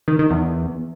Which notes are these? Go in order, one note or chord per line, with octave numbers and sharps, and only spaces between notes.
D#3
D#3
E2